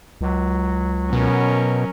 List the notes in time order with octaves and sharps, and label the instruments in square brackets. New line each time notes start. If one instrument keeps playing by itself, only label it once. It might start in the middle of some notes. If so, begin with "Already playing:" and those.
[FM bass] C#2 [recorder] F#3
[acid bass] B2 [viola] C#4 A#4